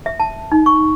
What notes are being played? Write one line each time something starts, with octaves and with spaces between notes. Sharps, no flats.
E5
A5
D#4
C#6